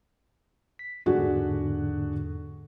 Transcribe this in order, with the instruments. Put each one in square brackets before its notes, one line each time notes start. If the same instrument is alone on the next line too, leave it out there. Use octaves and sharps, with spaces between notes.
[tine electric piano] B6
[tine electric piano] E2 G#2 D3 [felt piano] D4 F#4 G#4